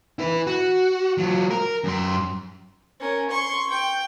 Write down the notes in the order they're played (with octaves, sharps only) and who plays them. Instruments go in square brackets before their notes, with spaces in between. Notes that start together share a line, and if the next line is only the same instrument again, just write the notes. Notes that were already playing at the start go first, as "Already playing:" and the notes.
[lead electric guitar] E4 B4
F#4
F#3 F4
A#4
F#2 C6
[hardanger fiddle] C#4 A#4
C6 C#6
G5